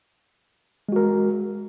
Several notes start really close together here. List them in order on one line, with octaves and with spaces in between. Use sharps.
G#3 F#4 A#4